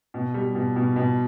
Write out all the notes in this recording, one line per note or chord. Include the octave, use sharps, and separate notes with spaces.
B2
G3
B2
B2
B2